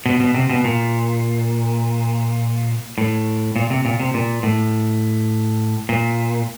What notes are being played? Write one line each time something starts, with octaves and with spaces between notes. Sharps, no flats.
B2
B2
C3
B2
A#2
A2
A#2
C3
A#2
C3
A#2
A2
A#2